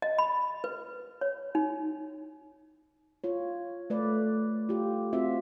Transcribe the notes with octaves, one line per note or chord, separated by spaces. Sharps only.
D#5
B5
B4
C#5
D#4
F4 C#5
A3 B4 D5
F4 G4
C4 F4 F#4 E5